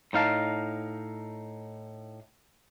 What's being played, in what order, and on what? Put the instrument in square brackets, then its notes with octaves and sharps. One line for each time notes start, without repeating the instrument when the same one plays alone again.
[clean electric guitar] A2 D#4 F5 A5